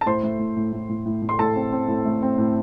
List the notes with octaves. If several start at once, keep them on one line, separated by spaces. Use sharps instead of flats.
A5
A2 C5 C6
A3
A2
A2
A2
A2
A2
A2
C6
A2 A4 A5
C4
C4
A2
A3
C4
A2